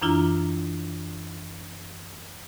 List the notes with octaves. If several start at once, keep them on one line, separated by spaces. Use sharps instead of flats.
F#2 E3 D4 E4 F4 A#5